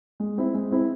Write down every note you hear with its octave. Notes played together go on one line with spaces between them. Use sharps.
G#3
C4 E4
G#3
C4 E4